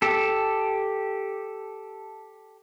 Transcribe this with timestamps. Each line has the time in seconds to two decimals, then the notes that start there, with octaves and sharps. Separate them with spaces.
0.02 G4 A4